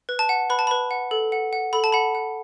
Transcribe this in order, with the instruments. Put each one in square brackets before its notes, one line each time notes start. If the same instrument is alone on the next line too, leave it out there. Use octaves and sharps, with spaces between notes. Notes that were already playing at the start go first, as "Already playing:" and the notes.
[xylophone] B4
A5
F#5
B4 B5
A5
B4 B5
F#5
A4
F#5
F#5
A4 B5
A5
F#5 B5
F#5